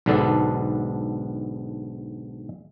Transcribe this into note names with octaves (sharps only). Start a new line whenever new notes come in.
B1 G#2 D3 B3 D4 A4